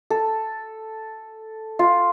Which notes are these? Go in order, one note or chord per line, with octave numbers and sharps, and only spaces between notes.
A4
F4